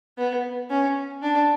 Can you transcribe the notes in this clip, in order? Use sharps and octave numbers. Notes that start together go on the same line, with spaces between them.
B3
C#4
D4